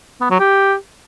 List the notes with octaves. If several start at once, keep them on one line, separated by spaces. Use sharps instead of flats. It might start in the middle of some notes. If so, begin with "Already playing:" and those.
B3
F#3
G4